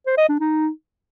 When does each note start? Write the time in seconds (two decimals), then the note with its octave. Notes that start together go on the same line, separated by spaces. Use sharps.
0.06 C5
0.18 D#5
0.29 D4
0.40 D#4